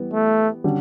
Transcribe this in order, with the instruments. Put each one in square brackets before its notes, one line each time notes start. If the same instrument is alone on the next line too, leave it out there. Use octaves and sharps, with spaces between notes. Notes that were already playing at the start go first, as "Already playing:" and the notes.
Already playing: [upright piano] E3 G3 B3
[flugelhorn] A3
[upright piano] D3 G3 C#4 G4